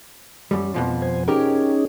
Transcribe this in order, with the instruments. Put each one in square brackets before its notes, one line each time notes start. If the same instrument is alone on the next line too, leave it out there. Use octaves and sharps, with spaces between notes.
[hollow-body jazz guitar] F#2 G3
F2 B2 F3
[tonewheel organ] C5 G#5
[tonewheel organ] C#4 D#4 G#4 [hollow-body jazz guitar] G4 A#4